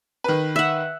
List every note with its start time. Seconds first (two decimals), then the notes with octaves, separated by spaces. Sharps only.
0.24 D#3 B4
0.56 E5 F#5